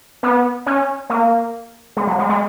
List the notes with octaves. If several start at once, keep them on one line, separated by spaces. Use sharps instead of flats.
B3
C#4
A#3
G#3
F#3
G#3
G#3